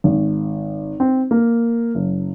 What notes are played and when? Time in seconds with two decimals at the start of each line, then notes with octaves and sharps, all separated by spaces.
0.04 G#1
1.00 C4
1.31 A#3
1.95 F#1